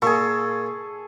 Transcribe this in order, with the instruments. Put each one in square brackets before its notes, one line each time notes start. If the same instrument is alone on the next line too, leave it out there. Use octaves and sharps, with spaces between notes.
[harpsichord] A#2 [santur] G#4 A4 [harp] C#6